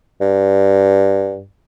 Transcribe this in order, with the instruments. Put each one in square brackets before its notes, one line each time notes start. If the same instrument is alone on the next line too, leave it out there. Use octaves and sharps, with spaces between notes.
[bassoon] G2